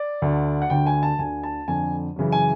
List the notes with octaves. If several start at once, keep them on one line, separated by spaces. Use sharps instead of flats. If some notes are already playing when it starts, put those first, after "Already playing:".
Already playing: D5
D2 D3
F#5
D2 D3 G5
G#5
A5
D2 D3 G#5
A5
F2 D3 G#5
F#2 C#3 E3
G#5